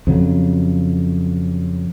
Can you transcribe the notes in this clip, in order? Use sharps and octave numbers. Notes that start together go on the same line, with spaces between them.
F2 C#3 F#3